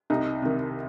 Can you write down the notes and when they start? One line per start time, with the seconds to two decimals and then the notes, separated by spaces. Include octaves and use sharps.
0.10 C2 D#4
0.42 C3 D#3